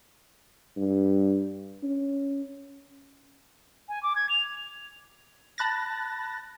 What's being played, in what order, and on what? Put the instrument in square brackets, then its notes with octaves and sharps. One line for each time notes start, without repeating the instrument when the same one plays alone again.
[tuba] G2
C#4
[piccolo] G#5
D6
G#6
F7
[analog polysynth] A5 B5 F#6 A6 A#6